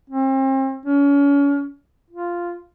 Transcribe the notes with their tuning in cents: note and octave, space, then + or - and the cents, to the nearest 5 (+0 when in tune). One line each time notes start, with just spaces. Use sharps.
C4 +40
C#4 +35
F4 -5